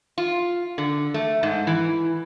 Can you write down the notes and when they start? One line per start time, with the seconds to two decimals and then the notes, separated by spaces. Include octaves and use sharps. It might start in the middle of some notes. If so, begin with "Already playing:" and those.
0.18 F4
0.78 D3
1.14 A3
1.43 G#2
1.67 E3